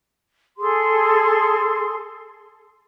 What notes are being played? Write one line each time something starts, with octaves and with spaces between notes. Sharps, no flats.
G#4 A4 C6